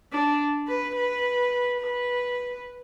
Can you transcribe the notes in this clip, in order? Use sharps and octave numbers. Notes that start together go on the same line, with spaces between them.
D4
B4
B4
B4